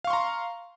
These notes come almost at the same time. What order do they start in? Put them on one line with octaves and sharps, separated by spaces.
F5 C#6 C6 A#5